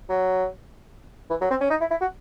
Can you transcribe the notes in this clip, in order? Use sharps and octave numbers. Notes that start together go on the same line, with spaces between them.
F#3
E3
F#3
C4
C#4
D#4
E4
E4
F#4